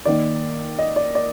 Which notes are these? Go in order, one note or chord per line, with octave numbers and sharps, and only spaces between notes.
D#3 A#3 D5
D#5
D5
D5